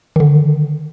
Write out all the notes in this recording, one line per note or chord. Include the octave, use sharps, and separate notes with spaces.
D3 D#3